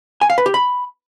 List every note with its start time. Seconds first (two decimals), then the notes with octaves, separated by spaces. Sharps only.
0.21 G#5
0.30 F5
0.38 B4
0.46 G4
0.54 B5